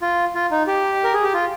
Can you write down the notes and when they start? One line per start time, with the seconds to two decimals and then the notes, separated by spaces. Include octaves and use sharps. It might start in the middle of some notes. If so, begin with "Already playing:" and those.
0.02 F4
0.35 F4
0.51 D#4
0.67 G4
1.04 A#4
1.14 G#4
1.23 G4
1.33 F4